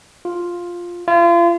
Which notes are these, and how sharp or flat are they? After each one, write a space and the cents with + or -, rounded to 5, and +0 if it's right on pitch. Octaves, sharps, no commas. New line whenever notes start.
F4 +5
F4 -35